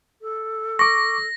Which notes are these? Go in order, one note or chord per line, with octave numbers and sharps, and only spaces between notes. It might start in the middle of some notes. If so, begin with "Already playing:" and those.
A4
C#6 D6 A#6